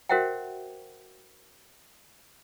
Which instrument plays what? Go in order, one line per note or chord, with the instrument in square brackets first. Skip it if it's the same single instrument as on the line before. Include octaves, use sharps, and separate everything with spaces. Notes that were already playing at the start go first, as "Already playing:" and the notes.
[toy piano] F#4 A#4 C5 E5 F#5 G5